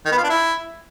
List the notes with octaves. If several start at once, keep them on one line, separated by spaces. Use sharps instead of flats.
D#3
B3
F4
D4
E4